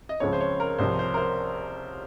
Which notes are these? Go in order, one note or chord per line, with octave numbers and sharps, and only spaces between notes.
D#5
C#2 C#3 F3 C4 C#5
C5
C#5
A#4
C2 C3 F3 C5
C5
A#4
C5